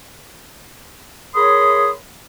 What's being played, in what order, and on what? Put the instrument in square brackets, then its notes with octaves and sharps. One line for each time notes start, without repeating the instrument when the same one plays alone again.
[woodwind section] G#4 A#4 C#5 B5 C6 D#6